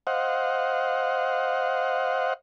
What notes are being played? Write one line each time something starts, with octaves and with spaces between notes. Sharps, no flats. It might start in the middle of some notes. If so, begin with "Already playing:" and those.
C5 D#5 F5 F#5